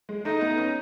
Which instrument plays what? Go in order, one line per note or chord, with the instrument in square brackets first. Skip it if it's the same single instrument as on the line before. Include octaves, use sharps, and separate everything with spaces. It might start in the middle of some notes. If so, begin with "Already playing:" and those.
[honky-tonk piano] G#3
[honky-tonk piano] A3 [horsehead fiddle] D#4
[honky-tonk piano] B3
C#4